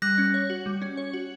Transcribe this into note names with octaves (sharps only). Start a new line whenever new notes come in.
G3 F#6 A#6
C#4
C#5
F#4
G3
C#4
C#5
F#4